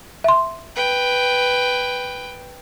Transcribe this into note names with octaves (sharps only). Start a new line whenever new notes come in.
E5 C6
B4 G5